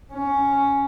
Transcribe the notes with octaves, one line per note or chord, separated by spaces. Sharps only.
C#4